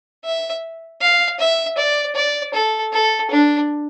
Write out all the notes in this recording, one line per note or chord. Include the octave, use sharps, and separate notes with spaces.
E5
F5
E5
D5
D5
A4
A4
D4